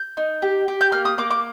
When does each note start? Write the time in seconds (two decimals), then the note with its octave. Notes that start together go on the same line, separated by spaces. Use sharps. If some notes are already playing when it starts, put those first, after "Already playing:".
Already playing: G6
0.17 D#4
0.42 G4
0.68 G4
0.81 G6
0.92 A#3 F6
1.05 D#6
1.18 A#3 D6
1.31 D6